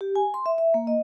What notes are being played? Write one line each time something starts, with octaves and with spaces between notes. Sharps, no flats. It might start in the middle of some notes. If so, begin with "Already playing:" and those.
G4
G#5
C6
E5
E5
A#3
D#5